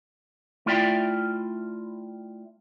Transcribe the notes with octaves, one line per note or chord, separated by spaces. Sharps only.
A3 E4 F4 D5 E5 G5